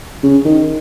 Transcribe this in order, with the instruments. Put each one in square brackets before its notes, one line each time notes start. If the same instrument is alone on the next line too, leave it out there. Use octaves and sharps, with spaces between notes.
[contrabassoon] C#3
D#3